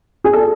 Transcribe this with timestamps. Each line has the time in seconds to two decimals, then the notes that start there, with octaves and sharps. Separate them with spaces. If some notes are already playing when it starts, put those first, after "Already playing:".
0.24 G#4
0.33 A4